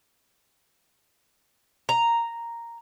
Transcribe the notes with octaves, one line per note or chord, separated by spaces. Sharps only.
A#5